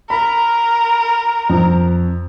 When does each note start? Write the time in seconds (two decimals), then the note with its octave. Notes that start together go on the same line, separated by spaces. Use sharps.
0.10 A#4 B5
1.49 F2